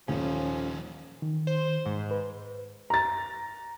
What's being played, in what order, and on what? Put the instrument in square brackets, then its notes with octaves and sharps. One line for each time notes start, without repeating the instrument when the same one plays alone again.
[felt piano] D#1 [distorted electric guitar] D#3 F#3 [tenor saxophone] F3 [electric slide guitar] C#4
[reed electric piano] D#3
[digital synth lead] C5
G#2
[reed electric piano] B4
[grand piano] A#5 A6